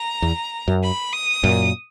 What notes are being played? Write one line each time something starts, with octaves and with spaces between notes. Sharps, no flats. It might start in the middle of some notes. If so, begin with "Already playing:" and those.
Already playing: A#5
E2
F#2
B5
D#6
F#2 A#2